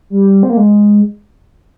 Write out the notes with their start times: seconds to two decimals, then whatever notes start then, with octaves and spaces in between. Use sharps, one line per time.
0.10 G3
0.43 C4
0.50 A#3
0.57 G#3